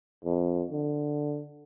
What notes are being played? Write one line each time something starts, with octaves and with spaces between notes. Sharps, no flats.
F2
D3